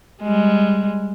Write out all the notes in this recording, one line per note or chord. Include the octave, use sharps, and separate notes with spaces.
G3 G#3